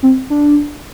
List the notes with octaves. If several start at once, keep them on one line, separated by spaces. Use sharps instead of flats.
C4
D4